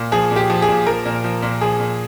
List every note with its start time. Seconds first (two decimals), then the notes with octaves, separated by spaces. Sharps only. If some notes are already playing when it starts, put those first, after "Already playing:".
Already playing: A#2
0.12 F3 G#4
0.31 A#2
0.36 G4
0.50 F3
0.62 G#4
0.68 A#2
0.87 F3 A#4
1.05 A#2
1.24 F3
1.43 A#2
1.61 F3 G#4
1.80 A#2